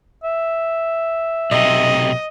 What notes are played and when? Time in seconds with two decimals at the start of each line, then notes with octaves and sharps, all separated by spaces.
0.24 E5
1.51 B1 C3 D#5